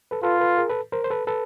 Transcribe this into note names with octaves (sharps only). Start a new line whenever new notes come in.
A4 B4
F4 A4 B4
A4 B4
G#4 A#4
A4 B4
A#4 C5
C5
A4 B4
A4 B4